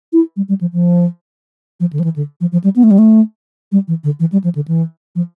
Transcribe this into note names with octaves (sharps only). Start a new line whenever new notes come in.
E4
G3
G3
F3
F3
F3
D3
F3
E3
D3
F3
F3
G3
B3
A3
G3
A3
G3
E3
D3
E3
G3
F3
D3
E3
F3